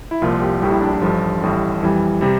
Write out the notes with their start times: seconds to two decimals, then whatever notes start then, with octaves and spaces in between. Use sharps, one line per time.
0.11 E4
0.22 C2 A#2 F3 F4
0.42 G4
0.61 A#1 A2 G3 G4
0.71 E4
0.81 D4
0.92 E4
1.02 A1 G2 D3 F3 F4
1.42 A1 A2 G3
1.82 F2 E3 G3
2.21 C3 G3